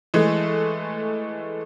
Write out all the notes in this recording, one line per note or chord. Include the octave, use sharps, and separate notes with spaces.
E3 G#3 A3